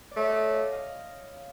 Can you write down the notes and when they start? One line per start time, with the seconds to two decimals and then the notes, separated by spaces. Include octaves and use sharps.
0.11 D5
0.16 A3 C#5 D#5
0.29 D#5
0.35 D5 E5
0.53 D#5 F5
0.72 D#5 F5